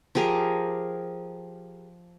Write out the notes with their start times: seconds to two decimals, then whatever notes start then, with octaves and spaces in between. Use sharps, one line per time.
0.15 F3 G4 G#4 A#4